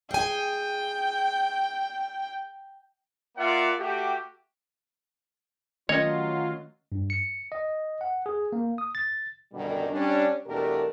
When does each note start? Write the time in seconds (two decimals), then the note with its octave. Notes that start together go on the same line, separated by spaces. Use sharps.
0.11 G#4 G5 G#5
3.38 A#3 F4 D5 E5 F#5
3.79 A3 F#4 G4
5.89 D#3 F#3 A3 C#4 F4 C#5 D#5
6.92 G2
7.10 C#7
7.52 D#5
8.01 F#5
8.26 G#4
8.52 A#3
8.78 D#6
8.95 A6
9.52 F#2 B2 D3 D#3 G3
9.90 G3 C#4 D4
10.46 E2 B2 A3 D4 G4 A#4